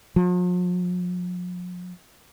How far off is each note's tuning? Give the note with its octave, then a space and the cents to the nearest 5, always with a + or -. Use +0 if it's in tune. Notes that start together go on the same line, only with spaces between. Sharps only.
F3 +45